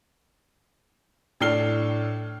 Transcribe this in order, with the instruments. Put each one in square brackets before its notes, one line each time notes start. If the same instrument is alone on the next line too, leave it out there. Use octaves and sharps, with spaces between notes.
[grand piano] A2 D4 A4 F6 C7 G7